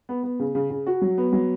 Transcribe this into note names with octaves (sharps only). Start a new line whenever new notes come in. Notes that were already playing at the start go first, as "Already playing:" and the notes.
B3
B3
C#3
C#3
C#3
F#4
F#3
B3
F#3